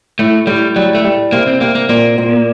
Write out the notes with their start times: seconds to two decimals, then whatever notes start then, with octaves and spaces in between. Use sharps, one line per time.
0.19 A2 A3
0.47 A2 G3
0.76 F#3 G3
0.95 A3
1.04 G3
1.32 C3 A#3
1.47 C4
1.61 C3 A#3
1.75 A#3
1.89 A#2 A#3
2.18 A#2